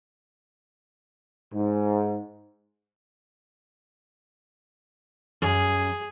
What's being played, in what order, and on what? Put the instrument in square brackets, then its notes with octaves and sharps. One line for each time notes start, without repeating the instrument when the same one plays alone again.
[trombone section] G#2
[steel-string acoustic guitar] F#2 [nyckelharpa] G#4